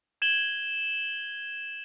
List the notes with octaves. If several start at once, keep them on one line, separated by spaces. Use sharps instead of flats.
G#6 E7 F#7 G7